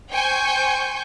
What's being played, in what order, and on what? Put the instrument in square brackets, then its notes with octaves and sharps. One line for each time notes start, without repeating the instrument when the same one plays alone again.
[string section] C5 G5 G#5 C#6 G6